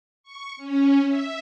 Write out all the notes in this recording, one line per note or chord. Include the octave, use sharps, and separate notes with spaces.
C#6
C#4
E5